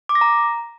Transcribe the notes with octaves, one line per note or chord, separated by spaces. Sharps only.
D6
A#6
A#5